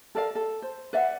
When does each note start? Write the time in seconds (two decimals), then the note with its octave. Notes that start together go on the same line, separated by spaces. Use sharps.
0.15 A4 A#4 D5 F5
0.35 A4
0.62 C5
0.93 B4 D5 E5 F#5